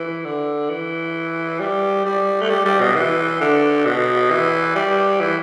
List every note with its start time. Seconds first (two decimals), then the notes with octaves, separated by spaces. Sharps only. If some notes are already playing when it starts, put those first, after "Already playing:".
Already playing: E3
0.25 D3
0.70 E3
1.60 G3
2.05 G3
2.41 A3
2.50 G3
2.65 G3
2.81 B2
2.95 E3
3.41 D3
3.85 B2
4.31 E3
4.76 G3
5.21 E3